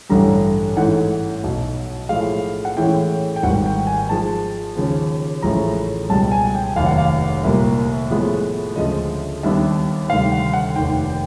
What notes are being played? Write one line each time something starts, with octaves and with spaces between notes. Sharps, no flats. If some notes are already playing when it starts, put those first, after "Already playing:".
A1 G2 D3 G3 A#5
G#2 E3 A3 C#4 F#5
B1 B2 F#3
A2 F3 G#3 F5
F#5
A2 E3 G#3 C#4 G5
G5
G#1 G#2 D#3 G3 F#5
G5
G#5
G#2 F3 G#3 A5
D#2 C#3 F3
A1 A2 F3 G#3 C#4 A#5
C#2 B2 G3 A5
G#5
G5
F1 D#2 D#3 F#3 F5
F#5
F5
C2 A#2 G3 A#3
A2 F3 G#3 B3
D2 C#3 F3 G#3 D#5
D#2 D#3 G3 B3 D4 E5
D2 C3 D#3 G3 F5
F#5
F#5
F1 D#2 D#3 G5
G5